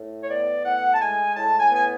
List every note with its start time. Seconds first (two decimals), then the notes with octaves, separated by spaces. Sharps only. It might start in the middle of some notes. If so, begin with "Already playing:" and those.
Already playing: A2
0.22 C#5
0.29 B3 D5
0.65 A2 F#5
0.93 A5
1.00 G#3 G#5
1.36 A2 A5
1.59 G#5
1.71 B3 G#5